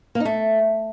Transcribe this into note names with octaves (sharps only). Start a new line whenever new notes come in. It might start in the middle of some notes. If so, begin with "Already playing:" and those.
A#3
D#4
A3